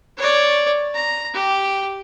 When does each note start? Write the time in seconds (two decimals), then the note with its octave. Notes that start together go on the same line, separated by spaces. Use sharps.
0.18 C#5 D5
0.94 A#5
1.34 G4